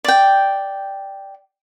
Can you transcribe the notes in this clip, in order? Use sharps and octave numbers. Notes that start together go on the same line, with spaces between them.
D5 G5